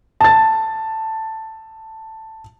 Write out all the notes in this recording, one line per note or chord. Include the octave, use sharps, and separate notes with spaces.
A5 A6